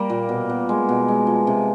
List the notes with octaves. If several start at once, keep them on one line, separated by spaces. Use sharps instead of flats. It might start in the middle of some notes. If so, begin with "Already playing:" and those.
Already playing: G3 A#3
A#2
B2
B2
G#3
B2
G#3
F3
C3